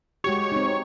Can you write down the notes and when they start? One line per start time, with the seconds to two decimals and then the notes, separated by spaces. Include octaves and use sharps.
0.24 G#3 F#4 G4 C#5
0.52 C4 D#4